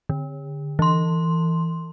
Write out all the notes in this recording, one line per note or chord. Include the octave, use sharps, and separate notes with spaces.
D3
E3 C6